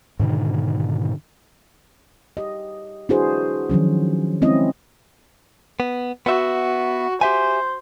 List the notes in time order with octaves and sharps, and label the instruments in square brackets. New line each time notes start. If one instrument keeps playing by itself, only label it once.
[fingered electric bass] G#2 B2 D3 D#3
[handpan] G4 D#5
D4 E4 F#4 G#4 B4 C5
D#3 F3 F#3 C#4
G#3 C4 C#4 E4 D#5
[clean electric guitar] B3
[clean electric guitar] B3 E5 [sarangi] F#4
[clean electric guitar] G4 E5 G#5 [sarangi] C5